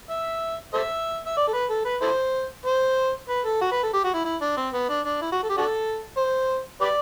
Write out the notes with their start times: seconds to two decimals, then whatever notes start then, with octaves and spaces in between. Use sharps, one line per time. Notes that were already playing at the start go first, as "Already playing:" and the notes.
0.10 E5
0.74 A4 C5 E5
1.26 E5
1.37 D5
1.48 A4
1.54 B4
1.70 A4
1.85 B4
2.02 E4 A4 C5
2.66 C5
3.29 B4
3.46 A4
3.61 F#4
3.72 B4
3.83 A4
3.93 G4
4.04 F#4
4.14 E4
4.25 E4
4.41 D4
4.57 C4
4.73 B3
4.89 D4
5.05 D4
5.22 E4
5.32 F#4
5.43 A4
5.49 G4
5.57 D4 F#4 A4
6.17 C5
6.81 G4 B4 D5